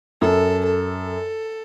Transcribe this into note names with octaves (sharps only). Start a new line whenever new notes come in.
F#2 A4
A4